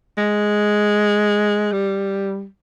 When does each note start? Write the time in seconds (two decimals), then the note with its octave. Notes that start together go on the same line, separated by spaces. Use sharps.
0.18 G#3
1.72 G3